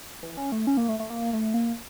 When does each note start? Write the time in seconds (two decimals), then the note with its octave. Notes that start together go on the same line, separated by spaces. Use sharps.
0.23 E3
0.37 C#4
0.52 A3
0.67 C#4
0.77 A#3
0.88 A3
1.00 A3
1.10 A#3
1.33 A3
1.54 A#3